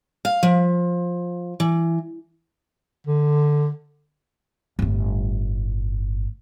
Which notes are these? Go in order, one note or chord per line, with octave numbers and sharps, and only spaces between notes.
F5
F3
E3
D3
G1 A2